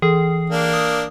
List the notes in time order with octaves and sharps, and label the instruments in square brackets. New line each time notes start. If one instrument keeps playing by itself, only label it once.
[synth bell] E3 [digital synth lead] G#4
[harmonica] A#3 D4
[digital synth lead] D#6